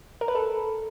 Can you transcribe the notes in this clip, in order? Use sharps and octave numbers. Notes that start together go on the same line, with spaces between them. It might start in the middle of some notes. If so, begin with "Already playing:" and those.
A#4
B4
A4